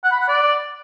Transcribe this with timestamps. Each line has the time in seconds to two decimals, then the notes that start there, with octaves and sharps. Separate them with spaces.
0.04 F#5
0.12 B5
0.20 F#5
0.28 D5